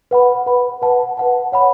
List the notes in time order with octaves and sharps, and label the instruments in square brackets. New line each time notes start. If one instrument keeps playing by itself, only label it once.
[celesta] B4 F#5 B5
B4 F#5 B5
B4 F#5 A5
B4 F#5 A5
C#5 F#5 B5